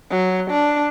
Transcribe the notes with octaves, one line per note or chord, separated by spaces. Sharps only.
F#3
D4